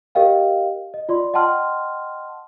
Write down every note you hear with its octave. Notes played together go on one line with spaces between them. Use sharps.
G4 A#4 D#5 F5 G5
D#5
F4 D5 C6
D#5 F#5 G5 A5 C6 F6